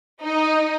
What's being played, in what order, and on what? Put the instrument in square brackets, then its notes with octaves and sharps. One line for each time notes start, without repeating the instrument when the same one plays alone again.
[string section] D#4